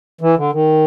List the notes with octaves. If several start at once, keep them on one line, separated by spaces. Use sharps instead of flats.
E3
D3
D#3